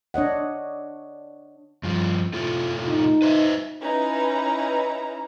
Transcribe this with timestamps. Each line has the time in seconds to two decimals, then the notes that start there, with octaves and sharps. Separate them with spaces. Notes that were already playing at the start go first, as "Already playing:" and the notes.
0.14 D4 C#5 D#5 F#5
1.83 G2 F3
2.33 A2 A3 F4
2.88 D#4
3.22 B4 C5 E5
3.81 C#4 D#4 E4 B4 A#5